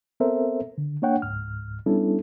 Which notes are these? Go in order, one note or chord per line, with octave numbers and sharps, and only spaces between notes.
B3 C4 A4 A#4 C5 E5
D3
A#3 D4 C#5 F#5 G5
C#2 G#2 F6
G3 B3 C#4 D4 E4 A4